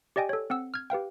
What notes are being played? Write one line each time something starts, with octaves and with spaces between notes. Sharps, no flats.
G4 D5 D#5 G5 G#5
A4 C#5
C4 F#5 E6
F6 G#6
G4 B4 F5 G5